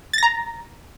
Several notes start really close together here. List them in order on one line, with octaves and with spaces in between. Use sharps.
A6 A#6 A#5